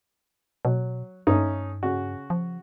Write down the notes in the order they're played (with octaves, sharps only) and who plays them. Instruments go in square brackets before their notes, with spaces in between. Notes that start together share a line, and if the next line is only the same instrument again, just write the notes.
[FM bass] B2 [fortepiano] F#3
[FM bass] G2 [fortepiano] A3 C#4 D#4
[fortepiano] C#3 F#4
[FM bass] F3